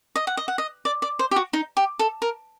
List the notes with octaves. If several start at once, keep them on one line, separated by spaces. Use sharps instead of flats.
D#5
F#5
D#5
F#5
D#5
D5
D5
C5
G4
F#4
D#4
G4
A4
A#4